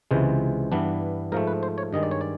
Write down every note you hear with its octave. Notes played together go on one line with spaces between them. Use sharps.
C#2 C3 E3 G#3
G2 E3 G3 B3 D4
G#2 F3 A3 A#4
B4
C5
C#5
G2 D#3 G#3 D#5
D5
C#5
D5